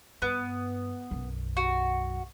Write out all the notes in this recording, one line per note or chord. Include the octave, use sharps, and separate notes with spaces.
G2 B3
B1 F#2
F#4